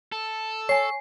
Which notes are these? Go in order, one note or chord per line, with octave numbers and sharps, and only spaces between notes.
A4
C#5 G#5 C7